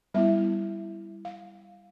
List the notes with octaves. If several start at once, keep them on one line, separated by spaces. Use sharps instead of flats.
G3 B3 E4 E5
F5